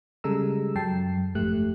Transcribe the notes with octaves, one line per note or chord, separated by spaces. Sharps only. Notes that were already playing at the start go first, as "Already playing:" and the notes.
C#3 G3 G#3 A4 A#5 E6
F#2 F#3 G5 A5 C7
G1 F2 G#2 A3 G4 F#6